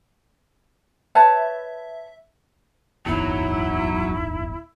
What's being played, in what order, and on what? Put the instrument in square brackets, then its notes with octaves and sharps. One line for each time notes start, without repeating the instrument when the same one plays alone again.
[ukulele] B4 C#5 A5 [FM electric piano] E5
[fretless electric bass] D1 G1 E2 [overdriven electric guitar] F#3 [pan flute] D#4 [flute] E4